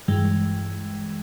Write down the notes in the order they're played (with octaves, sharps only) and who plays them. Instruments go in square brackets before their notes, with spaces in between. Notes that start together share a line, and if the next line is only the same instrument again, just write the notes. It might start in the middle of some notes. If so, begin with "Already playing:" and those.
[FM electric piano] G2 E3 G#3